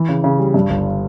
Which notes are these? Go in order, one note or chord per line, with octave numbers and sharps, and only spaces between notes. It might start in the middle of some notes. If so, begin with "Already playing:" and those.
Already playing: E3
C#3
C#3
G3
G2
G1